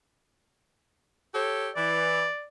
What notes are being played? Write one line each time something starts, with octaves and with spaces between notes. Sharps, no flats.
G4 A4 C#5
E3 D5